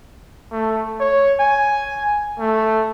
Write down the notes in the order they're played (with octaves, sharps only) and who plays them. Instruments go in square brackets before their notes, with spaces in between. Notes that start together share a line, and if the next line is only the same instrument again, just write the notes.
[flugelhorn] A3
C#5
G#5
A3